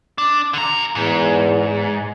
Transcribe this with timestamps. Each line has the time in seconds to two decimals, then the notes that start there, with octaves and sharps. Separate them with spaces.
0.18 D4
0.53 D3 A#5
0.95 E2 G#2